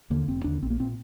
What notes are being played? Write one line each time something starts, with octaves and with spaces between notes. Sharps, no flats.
D#2 D3 A#3
F1 C4
D#2 D3 D4
A#1 C4
A#3
A#2 C4